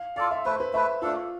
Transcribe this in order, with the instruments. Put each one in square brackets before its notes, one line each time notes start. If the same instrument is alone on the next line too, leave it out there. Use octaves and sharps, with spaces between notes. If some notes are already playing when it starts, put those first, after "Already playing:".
Already playing: [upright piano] F5
[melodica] F4 A4 D5 [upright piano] F5
[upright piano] E5
[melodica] A3 E4 B4 [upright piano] C5
[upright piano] B4
[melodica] A3 E4 B4 [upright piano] E5
[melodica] A3 D4 A4 [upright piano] F4